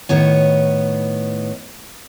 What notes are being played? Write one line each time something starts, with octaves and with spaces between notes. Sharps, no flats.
A2 D#3 B3 C#5